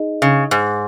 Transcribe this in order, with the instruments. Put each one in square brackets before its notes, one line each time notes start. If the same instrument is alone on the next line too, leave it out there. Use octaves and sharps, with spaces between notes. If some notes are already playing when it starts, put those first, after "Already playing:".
Already playing: [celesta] D#4 G#4 D#5
[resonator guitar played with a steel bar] C#3
G#2